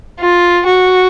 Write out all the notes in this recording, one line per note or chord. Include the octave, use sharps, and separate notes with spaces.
F4
F#4